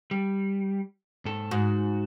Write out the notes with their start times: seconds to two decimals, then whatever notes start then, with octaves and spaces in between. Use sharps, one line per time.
0.11 G3
1.25 G#2 A4
1.51 G#2 F#4